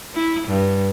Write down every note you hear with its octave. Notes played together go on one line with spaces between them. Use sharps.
E4
G2